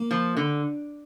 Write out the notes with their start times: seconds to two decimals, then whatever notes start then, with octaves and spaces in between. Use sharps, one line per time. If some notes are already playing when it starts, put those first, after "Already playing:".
Already playing: A#3
0.11 F3
0.37 D3